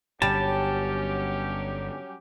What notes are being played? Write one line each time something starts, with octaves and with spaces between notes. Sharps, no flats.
G1 F#3 G3 C#4 G4 A5